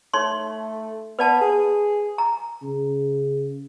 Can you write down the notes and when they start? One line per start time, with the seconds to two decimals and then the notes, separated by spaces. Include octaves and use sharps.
0.14 A3 D#4 C#5 C6
1.19 B3 B4 D5 A5
1.41 G#4
2.18 A#5
2.63 C#3